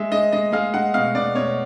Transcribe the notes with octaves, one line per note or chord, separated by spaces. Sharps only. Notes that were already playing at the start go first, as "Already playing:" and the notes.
Already playing: G#3 E5
G#3 D#5
G#3 D#5
G#3 F5
G#3 F#5
B2 F5
B2 D5
B2 C#5